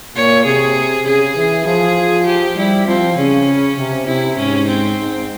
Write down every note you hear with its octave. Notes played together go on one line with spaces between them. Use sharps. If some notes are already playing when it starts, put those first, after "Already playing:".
A#2 C#5
C3 G#4
C#3 G#4
E3
F3 G#4
G4
G3 E4
F3 C4
C#3 C#4
C3
C3 E4
G#2 C#4
C4
G#2